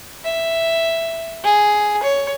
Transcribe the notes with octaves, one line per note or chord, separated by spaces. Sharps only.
E5
G#4
C#5